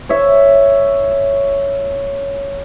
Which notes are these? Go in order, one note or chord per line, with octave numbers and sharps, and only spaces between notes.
C#5 E5